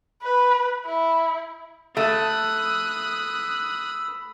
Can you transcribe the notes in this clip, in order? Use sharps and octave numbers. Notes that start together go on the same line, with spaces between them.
B4
E4
A3 B5 D#6 E6 F#6